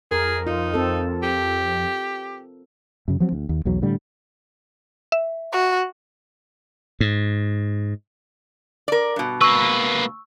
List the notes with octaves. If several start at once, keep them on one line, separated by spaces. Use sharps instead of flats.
F2 G#4 A#4
D#4 F4
C4 A4
G4
F#2 C#3
F3 F#3 C4
D2
D#2
B1 E2 B2 F#3
A2 D3 G3
E5
F#4
G#2
A#4 D5
G2 B2
A#3 B4 C#6 E6